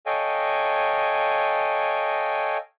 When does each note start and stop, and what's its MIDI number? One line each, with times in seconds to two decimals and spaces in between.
0.06 2.57 69
0.06 2.57 73
0.06 2.57 75
0.06 2.57 77
0.06 2.57 79
0.06 2.57 80